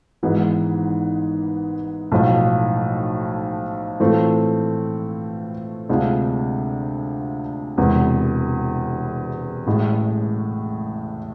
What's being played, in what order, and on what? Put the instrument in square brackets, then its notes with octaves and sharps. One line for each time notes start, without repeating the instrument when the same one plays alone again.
[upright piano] G#1 G#2 E3 G#3 B3
B1 A2 F3
A2 E3 A3 C4 F4
D2 C3 G#3 D4 F4
E1 E2 C3 E3
A1 A2 G#3